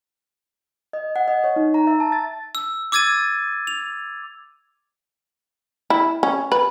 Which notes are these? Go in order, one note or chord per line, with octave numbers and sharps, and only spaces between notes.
D#5
F#5
D#5
C#5
D#4
A#5
E5
A5
A6
E6
D6 E6 G#6 A6 D#7
F7
E4
C#4
B4